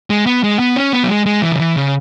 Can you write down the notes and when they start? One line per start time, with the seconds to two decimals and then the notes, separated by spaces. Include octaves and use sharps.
0.10 G#3
0.26 B3
0.44 G#3
0.59 B3
0.76 C#4
0.93 B3
1.03 F#3
1.10 G#3
1.26 G#3
1.42 E3
1.52 C#3
1.59 E3
1.76 C#3